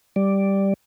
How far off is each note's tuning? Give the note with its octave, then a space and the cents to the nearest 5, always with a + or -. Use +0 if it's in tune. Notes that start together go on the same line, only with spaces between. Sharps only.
G3 +0 D5 +0